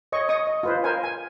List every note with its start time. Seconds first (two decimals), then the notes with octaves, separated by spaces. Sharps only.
0.12 C#5 D#5 C#6
0.29 D#5 C#6 D#6
0.47 D#5
0.63 F4 B4 C5
0.84 A#4 C5 F5 G#5
1.04 G#5